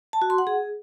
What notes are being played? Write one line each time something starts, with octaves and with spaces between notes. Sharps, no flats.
A5
F#4
C6
F#5
G#4